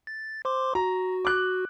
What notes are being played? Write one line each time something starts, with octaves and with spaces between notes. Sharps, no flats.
A6
C5 C6 D6
F#4 A#5
D6 F#6